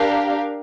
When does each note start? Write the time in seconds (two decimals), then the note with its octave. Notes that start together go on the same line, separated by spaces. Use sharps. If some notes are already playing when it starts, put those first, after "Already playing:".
Already playing: D4 G4 A#4 F5